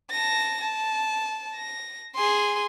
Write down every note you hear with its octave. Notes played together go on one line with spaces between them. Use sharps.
A5 A#6
A5
A#6
G#4 C6